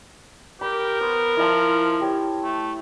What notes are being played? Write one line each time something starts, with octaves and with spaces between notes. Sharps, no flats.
G4 A#4 B5
B3 C5
F3 E4 D#5 A5
G4 C#5
A3